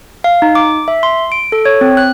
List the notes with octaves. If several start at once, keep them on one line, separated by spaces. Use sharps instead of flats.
F5
D#4
D6
E5
C6
D7
A4
C#5
C4
F#6